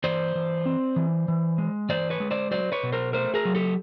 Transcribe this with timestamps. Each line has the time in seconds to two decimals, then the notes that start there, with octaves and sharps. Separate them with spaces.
0.04 E3 C5 D5
0.35 E3
0.66 C4
0.96 E3
1.28 E3
1.58 G#3
1.89 E3 C5 D5
2.10 B4 C#5
2.20 G#3
2.31 C5 D5
2.51 F#3 C5 D5
2.72 B4 C#5
2.83 B2
2.92 A#4 C5
3.13 A3 A#4 C5
3.34 G#4 A#4
3.45 F#3
3.55 G4 A4